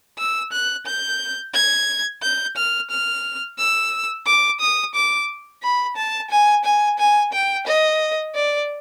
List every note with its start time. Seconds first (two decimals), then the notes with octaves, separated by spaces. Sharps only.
0.18 E6
0.52 F#6
0.86 G6
1.54 G#6
2.23 G6
2.57 F6
2.90 F6
3.59 E6
4.26 D6
4.61 D#6
4.95 D6
5.63 B5
5.97 A5
6.31 G#5
6.65 G#5
6.99 G#5
7.33 G5
7.67 D#5
8.35 D5